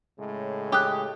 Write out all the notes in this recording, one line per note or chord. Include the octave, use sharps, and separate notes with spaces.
A2 C#3 G#3
G4 D6 D#6 F#6